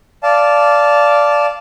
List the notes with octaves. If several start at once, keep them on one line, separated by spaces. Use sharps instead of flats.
D5 F5 A5